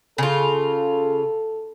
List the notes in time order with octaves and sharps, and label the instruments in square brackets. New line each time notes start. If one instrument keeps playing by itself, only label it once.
[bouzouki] C#3 F4 [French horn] A4